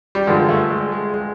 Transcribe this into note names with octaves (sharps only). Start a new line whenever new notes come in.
G3
G2 D3 F3 G#3
A3
G#3
G#3
G#3